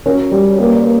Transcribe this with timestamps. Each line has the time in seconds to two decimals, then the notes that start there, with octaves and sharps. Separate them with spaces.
0.06 C#4 F#4 A#4
0.31 G3
0.58 A#3 G4 B4
0.76 B4 D5
0.84 A#3